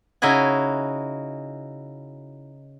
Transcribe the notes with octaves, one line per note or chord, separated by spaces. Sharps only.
C#3 D#4 E4 F#4 G#5